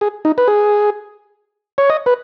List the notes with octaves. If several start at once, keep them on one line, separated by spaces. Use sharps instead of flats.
G#4
D#4
B4
G#4
C#5
D#5
B4